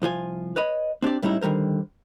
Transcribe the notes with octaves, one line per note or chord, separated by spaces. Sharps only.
C2 F3 F4 G#5
B4 C#5 D#5 B5
C4 D4 G4 D5
A2 G3 G#3 C#4 D#4 E4
D3 D#3 G3 A#4 C5